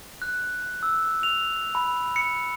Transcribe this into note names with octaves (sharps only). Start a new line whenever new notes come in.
F#6
E6
F7
B5
C#7